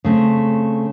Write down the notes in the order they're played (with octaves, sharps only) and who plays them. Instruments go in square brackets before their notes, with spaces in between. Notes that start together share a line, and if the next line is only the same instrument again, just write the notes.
[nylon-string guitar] C#3 A3 C4